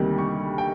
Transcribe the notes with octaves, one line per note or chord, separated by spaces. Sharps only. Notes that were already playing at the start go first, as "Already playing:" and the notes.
Already playing: D2 C3 D#3 G3 A#3
C#6
G5